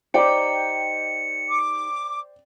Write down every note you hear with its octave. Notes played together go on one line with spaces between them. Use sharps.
D#4 G4 C5 D5 G5 C#7
D6